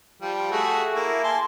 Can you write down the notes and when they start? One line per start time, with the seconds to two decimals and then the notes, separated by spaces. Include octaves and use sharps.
0.21 F3 G3
0.51 A3 F#4 G#4
0.95 A#3 E4
1.24 G#5 A5 C6